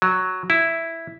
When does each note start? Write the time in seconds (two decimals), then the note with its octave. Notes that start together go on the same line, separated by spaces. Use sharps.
0.02 F#3
0.50 E4